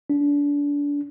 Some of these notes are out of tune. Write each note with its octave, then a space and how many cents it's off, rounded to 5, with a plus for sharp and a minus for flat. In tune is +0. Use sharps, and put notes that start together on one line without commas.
D4 -30